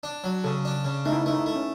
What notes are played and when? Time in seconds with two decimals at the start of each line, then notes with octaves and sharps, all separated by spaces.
0.03 D4
0.24 F#3
0.44 C#3 A4
0.65 D4
0.85 C#3
1.05 A3 D#4
1.12 E4
1.26 A3 D#4
1.39 E4
1.46 A3
1.56 C#4